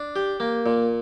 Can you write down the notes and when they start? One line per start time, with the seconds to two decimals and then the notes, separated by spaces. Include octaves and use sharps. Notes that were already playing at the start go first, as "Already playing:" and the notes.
Already playing: D4
0.16 G4
0.40 A#3
0.66 A#2